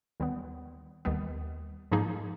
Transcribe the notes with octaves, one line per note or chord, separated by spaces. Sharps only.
D#2 D#3 G3 B3
D#2 D#3 G3 B3
G#2 F3 A#3 D#4 G#4